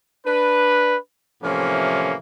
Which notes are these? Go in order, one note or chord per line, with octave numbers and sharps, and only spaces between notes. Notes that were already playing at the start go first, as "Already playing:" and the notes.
D4 B4
A2 C3 E3 F3 A#3 C#4